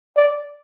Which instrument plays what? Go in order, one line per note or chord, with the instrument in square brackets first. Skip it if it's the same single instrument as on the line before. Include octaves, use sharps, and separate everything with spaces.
[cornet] D5